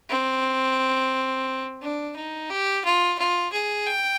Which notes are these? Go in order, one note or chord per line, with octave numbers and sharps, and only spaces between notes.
C4
D4
D#4
G4
F4
F4
G#4
G5